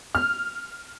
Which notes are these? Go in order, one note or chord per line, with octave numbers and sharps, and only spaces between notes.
F6